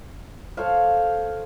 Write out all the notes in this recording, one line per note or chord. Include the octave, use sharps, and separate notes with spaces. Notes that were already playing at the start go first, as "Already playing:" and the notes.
A4 C5 C#5 F5